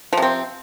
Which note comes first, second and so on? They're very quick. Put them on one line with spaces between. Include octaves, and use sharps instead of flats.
F3 C3 C4